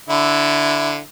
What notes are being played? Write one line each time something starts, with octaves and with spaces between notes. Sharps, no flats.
D3 E4